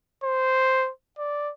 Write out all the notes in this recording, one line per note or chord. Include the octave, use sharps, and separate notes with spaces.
C5
D5